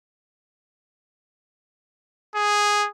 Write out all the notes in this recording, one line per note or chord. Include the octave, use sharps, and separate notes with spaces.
G#4